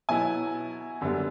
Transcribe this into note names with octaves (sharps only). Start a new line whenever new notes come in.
B2 F#3 B3 E4 G#5
F#2 D3 G3 B3